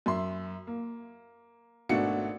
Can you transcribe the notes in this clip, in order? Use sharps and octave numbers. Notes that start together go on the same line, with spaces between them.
F#2 E5 C6
A#3
G#1 B2 A3 D4 F#4 C#7